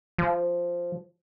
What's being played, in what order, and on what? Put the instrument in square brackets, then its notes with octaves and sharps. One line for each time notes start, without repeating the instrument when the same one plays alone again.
[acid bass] F3